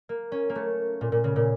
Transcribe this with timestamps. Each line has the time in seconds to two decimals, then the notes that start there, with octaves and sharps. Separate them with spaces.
0.09 A#3
0.32 C#4
0.50 A#3
0.55 A3
1.01 A#2
1.12 A#2
1.24 C#3
1.36 A#2